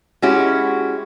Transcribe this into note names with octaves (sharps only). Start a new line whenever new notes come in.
G#3 C#4 E4 F#4 G4